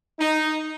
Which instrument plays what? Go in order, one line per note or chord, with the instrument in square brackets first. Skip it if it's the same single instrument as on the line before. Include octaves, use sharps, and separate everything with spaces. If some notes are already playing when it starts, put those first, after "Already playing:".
[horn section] D#4